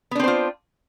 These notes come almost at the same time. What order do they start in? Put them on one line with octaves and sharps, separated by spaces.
B3 D4 C4 C5 F4